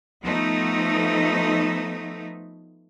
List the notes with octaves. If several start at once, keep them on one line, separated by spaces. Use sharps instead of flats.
F3 A3 B3 D#4